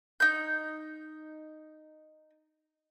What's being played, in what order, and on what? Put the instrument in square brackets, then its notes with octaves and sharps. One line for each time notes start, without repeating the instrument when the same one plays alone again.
[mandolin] D#4 G6